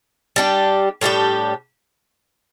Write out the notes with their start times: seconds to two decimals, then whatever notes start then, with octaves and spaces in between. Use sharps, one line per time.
0.36 G3 D4 G4
1.01 A2 G3 D4 G4